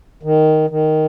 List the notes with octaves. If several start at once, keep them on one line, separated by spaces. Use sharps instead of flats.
D#3
D#3